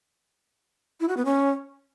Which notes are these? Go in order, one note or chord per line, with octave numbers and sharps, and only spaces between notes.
E4
F#4
B3
C#4